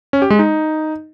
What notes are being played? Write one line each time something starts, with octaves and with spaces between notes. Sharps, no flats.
C#4
G4
G#3
D#4